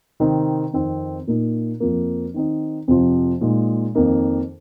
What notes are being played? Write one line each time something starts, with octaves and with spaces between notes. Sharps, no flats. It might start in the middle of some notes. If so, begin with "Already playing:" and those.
C3 D#3 C4 D#4
F2 D#3 C4
A#2 A#3 D#4
F2 F3 A#3
D#3 C4 D#4
F2 C3 F3
A#2 G#3 D#4
F2 D#3 A#3 D#4